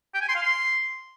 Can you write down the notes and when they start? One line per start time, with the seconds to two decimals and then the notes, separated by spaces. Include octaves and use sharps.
0.14 G5
0.21 G#5
0.28 C6
0.36 F5
0.43 C6